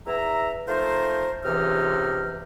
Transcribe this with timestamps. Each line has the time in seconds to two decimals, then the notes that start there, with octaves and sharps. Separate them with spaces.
0.07 E2 E5 A#5
0.67 F3 A3 D#4 A#4 C5
1.44 C#2 C3 E3 D#4 E5 F6